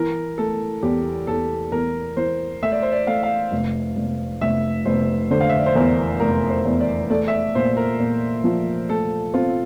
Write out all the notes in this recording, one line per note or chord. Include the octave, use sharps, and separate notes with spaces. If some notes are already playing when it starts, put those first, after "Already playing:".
Already playing: E3 A#4
A3 A4
E2 G4
E2 A4
E2 A#4
E3 C5
A3 E5
D5
C5
D5
A3 F5
F5
F1
F1
F1 E5
F1 C5
D3 C5
F5
E5
D5
C5
E2 A#4
F1 A#4
C5
E2
D5
A3 D5
E5
D5
A#2 C5
A#4
A#2
F3
A3 A4
C4 F4